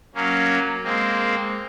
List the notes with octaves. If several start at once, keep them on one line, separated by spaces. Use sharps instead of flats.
F#3 A#3 C#4
G#3 A#3 C4